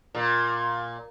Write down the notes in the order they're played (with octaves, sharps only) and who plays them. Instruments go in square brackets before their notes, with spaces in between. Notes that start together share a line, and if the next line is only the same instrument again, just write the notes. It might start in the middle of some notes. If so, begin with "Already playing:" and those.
[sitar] A#2